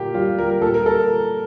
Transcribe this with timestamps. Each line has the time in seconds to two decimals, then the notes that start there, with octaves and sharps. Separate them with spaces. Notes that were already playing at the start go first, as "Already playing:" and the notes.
Already playing: A#2 A#3 G4
0.14 G3 F4
0.39 G3 A#4
0.50 A#4
0.62 A#2 A4
0.74 A#4
0.86 A4 A#4